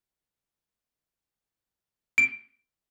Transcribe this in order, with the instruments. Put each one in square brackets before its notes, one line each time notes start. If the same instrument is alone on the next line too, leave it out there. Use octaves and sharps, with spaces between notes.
[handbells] D7